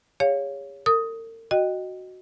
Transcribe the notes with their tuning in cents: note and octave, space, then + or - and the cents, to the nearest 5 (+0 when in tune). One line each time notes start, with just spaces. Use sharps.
G#4 -40 C#5 +10 F5 +0
A#4 -45 D#6 +10
F#4 +0 D#5 -5 G5 +0